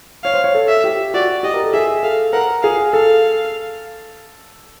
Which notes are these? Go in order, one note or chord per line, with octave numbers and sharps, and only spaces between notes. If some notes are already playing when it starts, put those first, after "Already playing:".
C#5 F5
C5
C#5
A4
E5
G4
F#4 D5
G4 D#5
A#4
A4
G#4 E5
A4 F5
A#4 F#5
G#4 F5
A4 F5